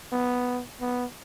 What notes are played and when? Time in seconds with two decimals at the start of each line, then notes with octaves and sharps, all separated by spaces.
0.12 B3
0.81 B3